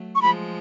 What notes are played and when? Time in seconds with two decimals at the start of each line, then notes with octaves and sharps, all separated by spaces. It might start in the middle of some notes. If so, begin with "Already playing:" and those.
Already playing: F#3 A3
0.15 C#6
0.21 F3 G#3 B5